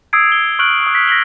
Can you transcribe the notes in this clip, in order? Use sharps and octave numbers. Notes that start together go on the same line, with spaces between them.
D#6 E6 G#6 C7 D7
G7
C#6 F6 F#6 D7 F#7
C#6 D#6
B6
A#6 B6 F#7 G7